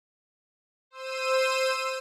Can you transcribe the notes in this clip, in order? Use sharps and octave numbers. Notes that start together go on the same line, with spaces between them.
C5 E6 D#7